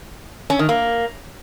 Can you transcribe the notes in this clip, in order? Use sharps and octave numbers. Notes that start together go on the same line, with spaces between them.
C#4
D#3
A#3